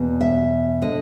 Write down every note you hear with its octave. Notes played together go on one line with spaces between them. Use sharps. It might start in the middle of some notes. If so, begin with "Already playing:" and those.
Already playing: E2 B2
E5
D3 D#5